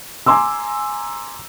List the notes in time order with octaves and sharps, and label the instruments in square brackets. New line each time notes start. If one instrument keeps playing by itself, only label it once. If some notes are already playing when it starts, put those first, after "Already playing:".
[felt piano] G#5 A#5 C6 D6 E6